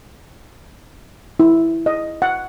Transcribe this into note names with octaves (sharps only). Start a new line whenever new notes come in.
E4
D#5
F#5